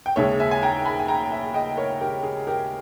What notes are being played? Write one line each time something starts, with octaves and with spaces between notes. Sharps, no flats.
G5
D#2 C#3 G#3 C#5 E5
E5 G#5
G#5
G5 A#5
G#5 B5
G#5
G5 A#5
E5 G#5
D#5 G5
A#4 C#5
G4 A#4
G#4
G4 A#4